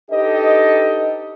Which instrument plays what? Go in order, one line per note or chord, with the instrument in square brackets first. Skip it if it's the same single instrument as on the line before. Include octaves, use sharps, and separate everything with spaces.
[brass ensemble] D4 D#4 G4 A4 B4 D#5